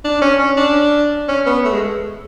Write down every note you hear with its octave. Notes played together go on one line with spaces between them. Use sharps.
D4
C#4
C#4
D4
C#4
B3
A3
G#3